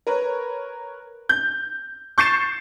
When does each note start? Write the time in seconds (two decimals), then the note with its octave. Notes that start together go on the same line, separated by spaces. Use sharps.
0.07 A#4 B4 C#5
1.29 G6
2.18 C#6 G6 A6 C7 C#7 E7